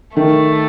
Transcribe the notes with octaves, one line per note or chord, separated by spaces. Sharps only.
D#3 A3